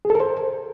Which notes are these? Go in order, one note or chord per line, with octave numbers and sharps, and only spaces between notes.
G#4
A4
A#4
C5